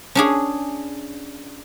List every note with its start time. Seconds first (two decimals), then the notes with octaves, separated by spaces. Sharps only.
0.15 C#4 D4 G#4